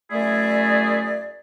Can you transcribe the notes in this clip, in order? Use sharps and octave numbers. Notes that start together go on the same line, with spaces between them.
F#2 A3 E4 G#4 D5